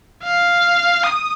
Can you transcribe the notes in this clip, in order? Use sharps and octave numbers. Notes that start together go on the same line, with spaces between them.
F5
D#6